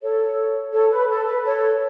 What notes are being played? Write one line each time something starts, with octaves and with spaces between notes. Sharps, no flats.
A4 C#5
A4 C#5
B4
A4
B4
A4 C#5